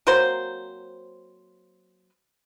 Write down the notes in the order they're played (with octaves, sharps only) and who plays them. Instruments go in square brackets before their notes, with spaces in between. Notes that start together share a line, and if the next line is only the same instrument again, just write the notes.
[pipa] F#3 A#3 C4 C5